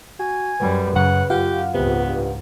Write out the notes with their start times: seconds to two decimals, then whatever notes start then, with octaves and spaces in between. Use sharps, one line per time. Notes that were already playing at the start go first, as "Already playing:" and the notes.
0.20 F#4 G#5
0.60 F#2 G3 B4
0.96 F#2 C#3 F#5
1.30 F#2 F4 G4 F5 F#5
1.74 C#2 G#2 C3 B3
2.07 G2